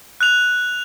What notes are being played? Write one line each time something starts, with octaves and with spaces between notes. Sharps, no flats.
F#6 F7